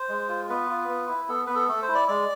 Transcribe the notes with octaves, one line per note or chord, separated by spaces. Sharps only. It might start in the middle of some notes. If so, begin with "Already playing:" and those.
Already playing: C5
G#3
F4
B3 B4
F4
B3
E4
B3 A4
B3 B4
A4
A3 A4
C5
E4
D5
G#3 D5